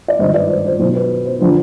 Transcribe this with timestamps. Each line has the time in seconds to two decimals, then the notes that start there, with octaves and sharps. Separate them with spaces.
0.08 D5
0.19 G#1 G2 D#3 C5 D#5
0.34 B4 D5
0.50 C5
0.66 C5
0.80 B1 C5
0.84 B2
0.95 B4
1.26 C5
1.41 D3 F3 C5